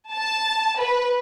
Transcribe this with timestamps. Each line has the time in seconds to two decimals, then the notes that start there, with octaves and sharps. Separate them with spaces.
0.12 A5
0.79 B4